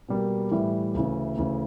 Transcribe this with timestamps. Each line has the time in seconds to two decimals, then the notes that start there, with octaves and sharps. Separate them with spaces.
0.09 B2 G3 A#3
0.52 A2 E3 G3
0.94 D2 C#3 E3
1.37 D2 C#3 E3